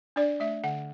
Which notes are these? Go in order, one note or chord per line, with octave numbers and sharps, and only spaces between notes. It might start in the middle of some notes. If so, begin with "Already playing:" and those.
D4 D5
A3 E5
D3 F#5